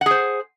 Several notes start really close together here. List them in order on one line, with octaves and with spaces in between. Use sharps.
F#5 G#4 C5